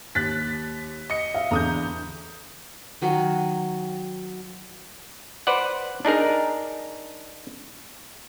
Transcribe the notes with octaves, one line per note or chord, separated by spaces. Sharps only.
D#2 F#6 A6 B6
D#5 C#7
E5 F5
E2 D3 A#5 D#6 G6
D#3 F#3
B4 C5 D5 F#5
D4 D#4 G#4 A#4